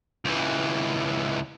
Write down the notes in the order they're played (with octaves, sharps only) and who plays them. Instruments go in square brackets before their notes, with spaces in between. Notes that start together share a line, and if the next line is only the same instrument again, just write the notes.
[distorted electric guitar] C#2 E3